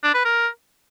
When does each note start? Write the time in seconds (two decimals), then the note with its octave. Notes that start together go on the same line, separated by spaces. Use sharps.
0.03 D4
0.14 B4
0.25 A#4